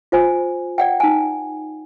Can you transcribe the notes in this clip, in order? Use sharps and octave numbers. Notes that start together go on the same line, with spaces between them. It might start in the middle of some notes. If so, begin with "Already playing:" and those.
F4 C5 G#5
D5 F#5 G5
D#4 G#5